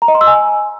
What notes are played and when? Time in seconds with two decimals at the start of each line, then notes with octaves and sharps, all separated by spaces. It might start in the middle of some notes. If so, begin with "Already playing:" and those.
0.02 A#5
0.08 D#5
0.15 C6
0.21 E6
0.27 G#5